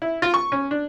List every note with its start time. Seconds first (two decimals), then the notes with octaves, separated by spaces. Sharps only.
0.02 E4
0.22 F4
0.34 C#6
0.52 C#4
0.71 D4